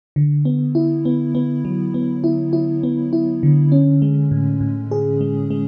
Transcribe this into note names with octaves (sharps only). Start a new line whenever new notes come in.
D3
B3
E4
B3
B3
F#3
B3
E4
E4
B3
E4
D3
C#4
G#3
A2
A2
G#4
G#3
G#3